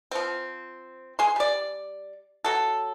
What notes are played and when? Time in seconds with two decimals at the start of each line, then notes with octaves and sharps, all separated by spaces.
0.11 F3 C4
1.19 G#4 C6
1.36 G3 D5
2.44 F#3 A4